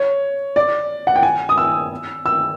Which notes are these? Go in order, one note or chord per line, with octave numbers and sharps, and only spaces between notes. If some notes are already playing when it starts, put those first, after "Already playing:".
Already playing: C#5
D5
F#5
G5
G#5
D#6
E6
E6